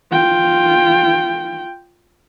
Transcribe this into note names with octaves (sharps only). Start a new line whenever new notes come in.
F4 G5